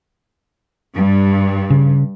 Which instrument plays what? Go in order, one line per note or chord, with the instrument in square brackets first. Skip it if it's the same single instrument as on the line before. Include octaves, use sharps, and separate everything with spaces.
[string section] G2
[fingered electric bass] C#3